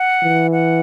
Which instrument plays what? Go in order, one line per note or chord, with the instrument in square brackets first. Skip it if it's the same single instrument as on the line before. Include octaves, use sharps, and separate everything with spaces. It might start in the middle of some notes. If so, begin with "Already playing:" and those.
Already playing: [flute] F#5
[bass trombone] E3
[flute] F#5